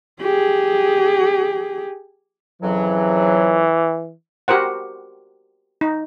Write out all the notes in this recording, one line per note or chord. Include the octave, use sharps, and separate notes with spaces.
G4 G#4
F2 C#3 E3 F#3
F#4 G4 A#4 C5 F#5
D#4